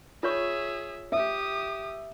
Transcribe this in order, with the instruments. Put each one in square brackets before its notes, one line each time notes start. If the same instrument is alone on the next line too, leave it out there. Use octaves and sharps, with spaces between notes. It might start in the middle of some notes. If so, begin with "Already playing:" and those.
[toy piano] F4 C#5 C#6 [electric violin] G#4 E5
[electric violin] G4 D#6 [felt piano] E5